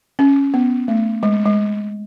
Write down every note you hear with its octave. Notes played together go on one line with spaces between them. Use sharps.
C#4
B3
A3
G#3
G#3